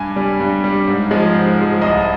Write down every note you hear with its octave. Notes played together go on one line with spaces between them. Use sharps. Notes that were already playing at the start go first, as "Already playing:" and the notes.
Already playing: G2 G#5
G3
G2
G3
G#2
F3 G#3
G#2
F3 G#3
C2 D#5